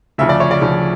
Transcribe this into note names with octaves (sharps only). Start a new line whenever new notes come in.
D2 C#3 F3 E5
D5
C#5
D5
D2 C#3 F3